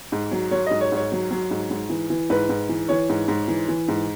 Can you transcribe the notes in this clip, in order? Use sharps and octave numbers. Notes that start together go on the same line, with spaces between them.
G#2
F#3
F#3 C#5
G#2 D#5
C#5
G#2 C#5
F#3
F#3
G#2
G#2
E3
E3
G#2 B4
G#2
E3
E3 C#5
G#2
G#2
E3
E3
G#2